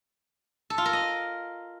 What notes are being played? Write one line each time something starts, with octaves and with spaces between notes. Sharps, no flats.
A4
F4
A#4
D#5